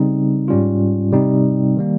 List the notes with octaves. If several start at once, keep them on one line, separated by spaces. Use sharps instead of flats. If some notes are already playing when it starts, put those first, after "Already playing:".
Already playing: C#3 G3 C4 D#4
G#2 G3 C#4 F4
C3 G3 C4 D#4
D#3 G3 A#3